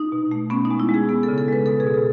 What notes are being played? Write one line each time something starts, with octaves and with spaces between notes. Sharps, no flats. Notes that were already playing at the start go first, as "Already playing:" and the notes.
Already playing: D#4
B2
A3
B3 C#4
D#4
G#3
E4
G#3 G#4
B3
A4
C#3
A4
G#3 B4
B2 A4
G#4
B2
A4